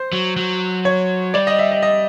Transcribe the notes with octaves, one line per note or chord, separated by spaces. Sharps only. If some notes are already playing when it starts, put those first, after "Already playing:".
Already playing: C5
F#3
F#3
C#5
G3 D5
D#5
E5
D#5
D#5